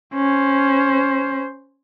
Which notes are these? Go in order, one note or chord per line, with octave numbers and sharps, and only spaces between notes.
C#4 C5